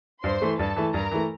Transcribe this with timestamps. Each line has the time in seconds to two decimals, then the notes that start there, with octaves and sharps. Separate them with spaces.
0.24 G2 C5 C6
0.42 E3 A3
0.59 G2 A4 A5
0.76 E3 A3
0.94 G2 A#4 A#5
1.11 E3 A3